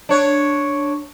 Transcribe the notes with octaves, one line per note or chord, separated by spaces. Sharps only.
D4 C#5